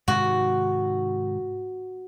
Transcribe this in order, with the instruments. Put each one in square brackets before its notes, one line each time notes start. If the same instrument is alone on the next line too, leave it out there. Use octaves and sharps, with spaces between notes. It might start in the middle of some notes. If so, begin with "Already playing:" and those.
[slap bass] G#2 C3 D#3 [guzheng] F#4